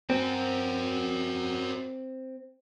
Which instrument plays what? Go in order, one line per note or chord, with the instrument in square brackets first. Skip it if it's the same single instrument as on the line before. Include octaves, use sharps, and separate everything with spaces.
[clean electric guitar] C4 [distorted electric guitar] F#4 A#4